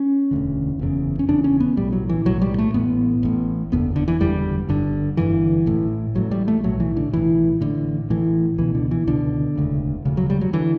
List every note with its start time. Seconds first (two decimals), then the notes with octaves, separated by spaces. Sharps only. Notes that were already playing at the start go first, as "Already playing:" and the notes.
Already playing: C#4
0.31 E1 D2 D3
0.79 F#1 E2 C#3
1.19 C#4
1.29 F#1 E2 C#3 D4
1.44 C#4
1.60 B3
1.77 B1 A2 G3
1.93 F#3
2.09 E3
2.25 B1 A2 F#3
2.42 G3
2.59 A3
2.74 A1 A2 B3
3.23 A1 A2
3.72 F#1 E2 D3 B3
3.96 D3
4.08 E3
4.20 F#1 E2 D3 G3
4.69 G1 G2 D3
5.17 G1 G2 D3 E3
5.66 A1 A2
6.15 A1 A2 F#3
6.31 G3
6.48 A3
6.63 B1 A2 F#3
6.80 E3
6.97 D3
7.13 B1 A2 E3
7.61 A1 A2 D3
8.10 A1 A2 E3
8.58 C#2 B2 E3
8.75 D3
8.91 E3
9.07 C#2 B2 D3
9.56 E1 D2 C#3
10.05 E1 D2 C#3
10.17 F#3
10.30 G3
10.41 F#3
10.53 D3 E3